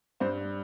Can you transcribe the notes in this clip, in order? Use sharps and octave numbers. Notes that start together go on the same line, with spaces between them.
G2 C5